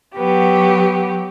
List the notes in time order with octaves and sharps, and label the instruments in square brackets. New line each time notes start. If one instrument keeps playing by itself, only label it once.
[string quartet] F#3 B3 G4